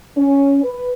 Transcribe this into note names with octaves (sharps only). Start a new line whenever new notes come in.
C#4
B4